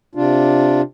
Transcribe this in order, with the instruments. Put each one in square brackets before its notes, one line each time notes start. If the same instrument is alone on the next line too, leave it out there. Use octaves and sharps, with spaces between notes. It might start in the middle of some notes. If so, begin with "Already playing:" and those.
[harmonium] C3 D4 F4